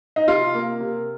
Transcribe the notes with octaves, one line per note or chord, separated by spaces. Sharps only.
D#4
C3 F4
A#3
C3